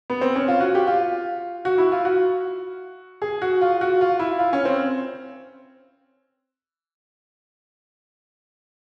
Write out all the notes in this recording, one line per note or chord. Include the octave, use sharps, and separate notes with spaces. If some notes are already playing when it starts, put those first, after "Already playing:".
B3
C4
C#4
F4
F#4
G4
F4
F#4
E4
F4
F#4
G#4
F#4
F4
F#4
F4
E4
F4
C#4
C4